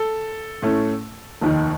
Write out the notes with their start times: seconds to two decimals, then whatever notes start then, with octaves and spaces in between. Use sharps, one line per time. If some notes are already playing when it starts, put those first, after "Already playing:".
Already playing: A4
0.62 A2 A3 C#4
1.41 F1 D#2 D#3